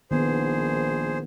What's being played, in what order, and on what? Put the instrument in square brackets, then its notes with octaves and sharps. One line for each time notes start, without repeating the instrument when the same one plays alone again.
[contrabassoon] A#1 [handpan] D#3 B3 [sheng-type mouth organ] G#4 C5